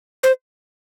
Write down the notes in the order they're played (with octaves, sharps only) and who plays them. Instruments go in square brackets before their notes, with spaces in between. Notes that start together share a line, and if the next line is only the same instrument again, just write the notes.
[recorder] C5